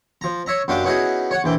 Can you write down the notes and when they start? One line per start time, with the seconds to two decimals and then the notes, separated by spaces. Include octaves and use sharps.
0.21 F3 A#5
0.46 C#5 E5 A#5
0.68 F#2 F#3 D4 G4 F5 D6
0.84 B3 C#4 D#4 E4 F#4 G#4
1.31 C#5 F#5
1.44 A#1 E3 G5